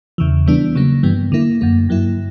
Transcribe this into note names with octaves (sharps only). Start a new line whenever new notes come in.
E2 C#3 E3
C#3 E3 G3 B3 D4
C#3 F#3 A#3
G2 E3 G3 B3
D3 A#3 E4
F#2 D3 A#3
G2 F#3 A#3 E4